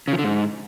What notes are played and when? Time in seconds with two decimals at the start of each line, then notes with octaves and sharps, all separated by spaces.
0.08 C#3
0.13 F3
0.19 D3
0.24 G#2